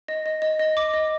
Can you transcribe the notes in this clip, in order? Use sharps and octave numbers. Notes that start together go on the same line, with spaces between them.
D#5
D#5
D#5
D#5
D6
D#5